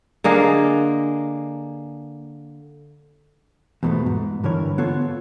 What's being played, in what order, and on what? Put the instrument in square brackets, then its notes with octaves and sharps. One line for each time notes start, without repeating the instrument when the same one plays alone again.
[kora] D3 A#3 G#4 D#5
[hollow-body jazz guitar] E2 G#2 B2 F3 A3
G#2
G2 D3 E3 A#4 C#5
B3 F4 A4 C#5